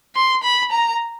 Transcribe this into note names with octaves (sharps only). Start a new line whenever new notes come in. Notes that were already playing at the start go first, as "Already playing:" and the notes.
C6
B5
A#5